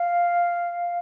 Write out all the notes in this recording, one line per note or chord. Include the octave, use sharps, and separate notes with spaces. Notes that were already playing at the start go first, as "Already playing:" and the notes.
Already playing: F5